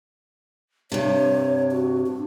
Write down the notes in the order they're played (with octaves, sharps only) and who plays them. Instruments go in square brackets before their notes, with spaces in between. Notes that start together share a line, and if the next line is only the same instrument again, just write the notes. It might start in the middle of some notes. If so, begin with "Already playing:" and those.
[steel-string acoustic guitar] G2 C3 [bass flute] C#5
[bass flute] F#4
D4